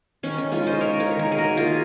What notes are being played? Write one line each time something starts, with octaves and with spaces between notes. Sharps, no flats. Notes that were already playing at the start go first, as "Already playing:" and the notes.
D#3 C#4
C#4
G#3 C#4 F4
C5 D#5
G#3 A#4 C#5
A#4 C#5
D#3
A#4 C#5
G#4
A#3 F#4 A#4
F4 G#4
D#3